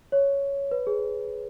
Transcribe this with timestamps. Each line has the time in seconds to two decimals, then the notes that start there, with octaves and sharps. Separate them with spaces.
0.12 C#5
0.71 B4
0.87 G#4